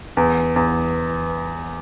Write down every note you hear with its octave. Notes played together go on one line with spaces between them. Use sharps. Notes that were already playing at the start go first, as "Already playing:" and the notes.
E2
E2